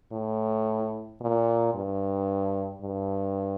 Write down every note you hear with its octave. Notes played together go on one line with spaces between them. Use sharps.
A2
A#2
G2
G2